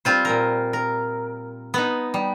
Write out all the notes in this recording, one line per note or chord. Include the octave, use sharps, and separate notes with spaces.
G3 C4 F4 C5
A#2 A#4
A#4
B3 D#4
G3